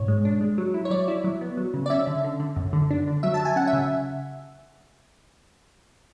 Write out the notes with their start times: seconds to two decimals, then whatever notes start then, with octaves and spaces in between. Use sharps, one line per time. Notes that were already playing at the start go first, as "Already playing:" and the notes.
Already playing: G#2 B2 C#5
0.08 G#3
0.25 D4
0.41 G#3
0.58 F#3
0.74 E4
0.85 C#5
0.90 F#3 D5
1.08 E4
1.24 F#3
1.41 B3
1.57 F#3
1.74 C#3
1.86 D5
1.90 C#4 E5
2.07 D3
2.24 D3
2.40 D3
2.56 F#2
2.73 D3
2.91 D4
3.07 D3
3.23 F#3 E5
3.34 A5
3.40 F#3
3.45 G#5
3.56 C#4 F#5
3.67 E5
3.73 C#3